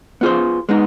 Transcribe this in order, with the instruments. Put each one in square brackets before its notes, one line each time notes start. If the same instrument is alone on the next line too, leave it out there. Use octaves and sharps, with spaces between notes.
[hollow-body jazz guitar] B3 F4 G#4 C5
G#3 B3 D#4